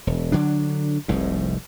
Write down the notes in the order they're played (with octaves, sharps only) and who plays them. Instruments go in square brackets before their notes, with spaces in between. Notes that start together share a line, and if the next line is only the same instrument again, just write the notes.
[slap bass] E1
D3 F#3 D4
F1 C2 G#2